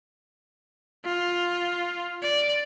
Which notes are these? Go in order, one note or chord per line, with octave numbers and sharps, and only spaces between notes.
F4
D5